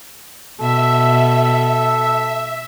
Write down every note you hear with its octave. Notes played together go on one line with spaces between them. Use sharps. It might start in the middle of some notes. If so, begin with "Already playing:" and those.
B2 A4 E5